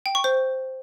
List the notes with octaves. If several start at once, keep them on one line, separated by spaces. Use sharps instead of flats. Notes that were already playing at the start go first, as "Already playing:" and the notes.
G5
C#6
C5